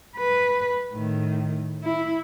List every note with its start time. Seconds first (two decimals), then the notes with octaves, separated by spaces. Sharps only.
0.16 B4
0.92 A2 D#3
1.84 E4